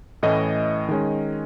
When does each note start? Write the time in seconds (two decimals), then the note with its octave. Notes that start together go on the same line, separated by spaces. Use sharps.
0.23 A2 E3 A3 C#4 D#5
0.89 D#3 G#3 C#4